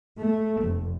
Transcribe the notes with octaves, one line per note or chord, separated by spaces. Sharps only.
A3
F1